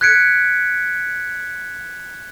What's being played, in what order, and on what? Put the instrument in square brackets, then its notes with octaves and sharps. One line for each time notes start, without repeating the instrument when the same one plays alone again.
[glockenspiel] F#6 G#6 B6 C#7 D7